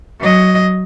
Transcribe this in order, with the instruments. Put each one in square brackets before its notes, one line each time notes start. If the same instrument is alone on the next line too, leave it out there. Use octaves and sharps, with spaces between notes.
[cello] F#3 D#5